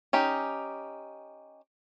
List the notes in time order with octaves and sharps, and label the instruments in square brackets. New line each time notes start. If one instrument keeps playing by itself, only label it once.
[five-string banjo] C#4 D#4 G4